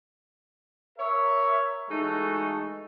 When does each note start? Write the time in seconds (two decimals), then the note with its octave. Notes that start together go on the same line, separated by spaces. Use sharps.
0.98 A#4 C#5 E5
1.90 E3 G#3 A3 D#4 F#4 A4